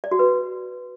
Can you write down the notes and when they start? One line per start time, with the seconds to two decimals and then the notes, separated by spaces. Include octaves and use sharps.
0.04 D5
0.11 F#4
0.19 B4